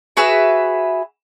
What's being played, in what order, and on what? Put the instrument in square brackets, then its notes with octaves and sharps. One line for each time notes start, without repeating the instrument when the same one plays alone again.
[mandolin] F#4 G#4 B4 E5